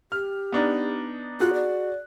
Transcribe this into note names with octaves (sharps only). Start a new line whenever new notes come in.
G4 F6
B3 D4 D#4
F4 F#4 G#4 F#6
D5